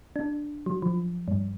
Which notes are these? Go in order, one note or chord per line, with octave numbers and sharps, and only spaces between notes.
D4
F#3
F3
G2